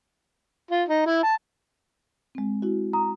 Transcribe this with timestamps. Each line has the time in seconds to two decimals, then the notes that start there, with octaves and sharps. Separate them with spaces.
0.71 F4
0.88 D#4
1.06 E4
1.23 A5
2.35 G#3 C4
2.62 E4 F#4
2.93 A#5 D#6